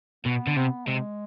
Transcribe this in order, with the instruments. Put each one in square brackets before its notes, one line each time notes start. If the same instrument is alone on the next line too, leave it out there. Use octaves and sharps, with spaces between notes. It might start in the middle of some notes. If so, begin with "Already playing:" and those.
[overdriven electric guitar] B2 [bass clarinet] B3
[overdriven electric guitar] D3
[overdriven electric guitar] C3 [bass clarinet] B3
[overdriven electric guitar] C3 [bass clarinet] G#3